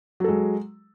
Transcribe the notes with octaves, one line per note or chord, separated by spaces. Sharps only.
F#3 G#3 A4